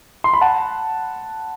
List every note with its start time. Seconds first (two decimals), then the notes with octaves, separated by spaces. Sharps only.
0.24 C6
0.33 B5
0.41 F#5 A5